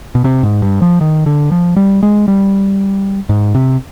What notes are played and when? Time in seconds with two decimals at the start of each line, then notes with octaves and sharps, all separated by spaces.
0.15 B2
0.24 C3
0.43 G#2
0.62 G2
0.82 F3
1.01 D#3
1.26 D3
1.52 F3
1.76 G3
2.03 G#3
2.28 G3
3.29 G#2
3.55 C3